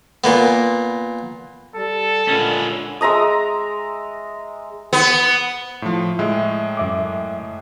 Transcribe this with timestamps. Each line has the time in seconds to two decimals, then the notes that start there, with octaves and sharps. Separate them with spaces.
0.24 A#2 A#3 B3
1.76 G3 A4
2.28 A#2 D3 G#3 C#4 B4
3.01 G#3 E5 A#5 D#6
4.93 B3
5.82 A2 F3
6.19 A2 G#3 E5
6.77 F#2 E5 D6